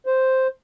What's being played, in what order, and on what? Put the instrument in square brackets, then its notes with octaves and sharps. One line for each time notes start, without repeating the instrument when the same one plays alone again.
[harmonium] C5